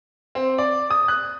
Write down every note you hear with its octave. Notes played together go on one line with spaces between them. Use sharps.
C4
D5
D#6
F#6